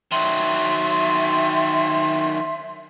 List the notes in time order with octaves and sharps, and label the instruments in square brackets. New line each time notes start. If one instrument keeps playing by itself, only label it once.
[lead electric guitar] D#3 F#3 [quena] E5 [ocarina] C6